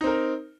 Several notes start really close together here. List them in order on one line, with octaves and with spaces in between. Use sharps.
D#4 C4 A#4